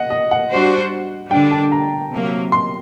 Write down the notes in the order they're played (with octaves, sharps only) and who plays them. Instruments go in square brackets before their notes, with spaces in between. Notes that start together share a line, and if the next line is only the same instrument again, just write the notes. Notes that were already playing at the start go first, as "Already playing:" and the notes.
Already playing: [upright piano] D#5 F#5
D#5
F#5
[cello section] G3 D4 F#4 C5
[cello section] D3 G3 D4 [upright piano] G5
[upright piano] A5
A#5
[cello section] C3 F#3 A#3
[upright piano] C6